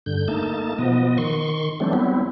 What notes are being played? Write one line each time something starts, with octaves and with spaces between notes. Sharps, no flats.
G2 D3 G6
A3 A#3 D#4 A5
B2 F3 B3 D#5
D#3 C6 C#6
E3 F#3 G3 A3 C4 D4
F#3 G3 B3 C4 E4